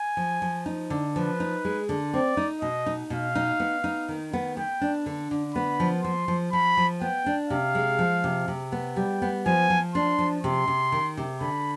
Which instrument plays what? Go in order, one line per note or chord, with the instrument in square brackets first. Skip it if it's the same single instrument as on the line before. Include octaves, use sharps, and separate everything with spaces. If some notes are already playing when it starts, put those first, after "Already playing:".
Already playing: [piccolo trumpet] G#5
[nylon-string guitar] F3
F3
D#4
D3
[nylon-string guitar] F3 [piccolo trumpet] B4
[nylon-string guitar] D#4
G#3
D3
[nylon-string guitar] C4 [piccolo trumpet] D5
[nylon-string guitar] D#4
[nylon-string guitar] B2 [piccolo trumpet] D#5
[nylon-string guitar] D#4
[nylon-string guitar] B2 [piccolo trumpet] F5
[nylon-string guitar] D#4
B3
D#4
D#3
B3
[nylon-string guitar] B3 [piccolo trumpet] G5
[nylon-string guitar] D4
D3
D3
[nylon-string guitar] B3 [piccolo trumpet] B5
[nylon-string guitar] F3
[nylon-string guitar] F3 [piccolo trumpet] C6
[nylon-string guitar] F3
[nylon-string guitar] F3 [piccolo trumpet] B5
[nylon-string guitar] F3
[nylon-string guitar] B3 [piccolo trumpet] G5
[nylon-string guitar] D4
[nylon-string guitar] C3 [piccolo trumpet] F5
[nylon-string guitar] G#3
F3
C3
C3
B3
[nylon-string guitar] G3 [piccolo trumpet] G5
[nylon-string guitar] B3
[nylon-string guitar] F3 [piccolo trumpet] G#5
[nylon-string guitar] F3
[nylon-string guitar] D4 [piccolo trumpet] C6
[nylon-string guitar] F3
[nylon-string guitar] C3 [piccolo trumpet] C6
[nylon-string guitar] C3
D#3
C3
[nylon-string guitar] D3 [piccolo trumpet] B5